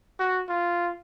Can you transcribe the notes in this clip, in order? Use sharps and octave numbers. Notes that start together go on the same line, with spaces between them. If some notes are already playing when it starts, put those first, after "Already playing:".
F#4
F4